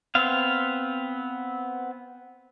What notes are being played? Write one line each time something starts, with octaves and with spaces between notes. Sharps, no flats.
B3 C4 F5